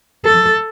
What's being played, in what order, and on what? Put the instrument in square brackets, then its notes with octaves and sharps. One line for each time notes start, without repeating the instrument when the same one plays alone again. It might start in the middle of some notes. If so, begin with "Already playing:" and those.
[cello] A4